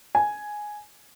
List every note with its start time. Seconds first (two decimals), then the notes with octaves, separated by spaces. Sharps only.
0.15 G#5